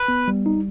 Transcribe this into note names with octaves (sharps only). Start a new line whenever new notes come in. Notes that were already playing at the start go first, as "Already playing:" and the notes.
Already playing: B4
B3
G3
D#4